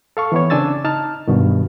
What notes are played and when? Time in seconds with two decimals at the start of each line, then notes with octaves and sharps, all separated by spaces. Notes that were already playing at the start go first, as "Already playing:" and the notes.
0.17 A4 F5 C#6
0.32 E3 B3 C#5
0.50 C#3 C4 D4 G#5 E6 A6
0.84 D#4 A5 F6
1.28 G2 B2 D#3